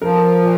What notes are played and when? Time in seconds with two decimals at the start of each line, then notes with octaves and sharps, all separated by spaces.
0.02 F3 A#4
0.42 A#2